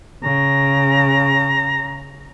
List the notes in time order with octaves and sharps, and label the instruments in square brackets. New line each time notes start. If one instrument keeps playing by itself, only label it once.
[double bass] C#3 [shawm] A#5